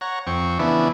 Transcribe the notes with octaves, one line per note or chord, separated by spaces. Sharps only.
C#5 F#5 A#5
F2 C4 C#6
C#3 E3 B3 D4 E4